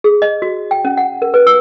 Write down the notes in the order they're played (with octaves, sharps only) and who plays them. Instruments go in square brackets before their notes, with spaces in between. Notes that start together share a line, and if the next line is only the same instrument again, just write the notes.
[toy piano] G#4
D#5
F#4
G5
C#4
F#5
A#4
B4
E6